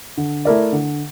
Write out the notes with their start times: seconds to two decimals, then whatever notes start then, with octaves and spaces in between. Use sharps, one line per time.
0.17 D3
0.45 A3 E4 A#4 D5
0.72 D3